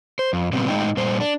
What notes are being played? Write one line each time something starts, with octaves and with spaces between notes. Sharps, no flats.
C5
F2
A#2 C#3 G3 B3 C4
A2 G#3 D4 D#4 G5
A#2 G3 C5
D4